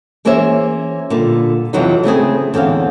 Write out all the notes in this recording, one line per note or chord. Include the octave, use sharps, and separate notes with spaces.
E3 A#3 C#4 G#4 C5 E5
A#2 D3 G3
F2 C3 E3 F#3 D#4
C#3 A3 C4 G#4
E2 D3 C4 C#4 F5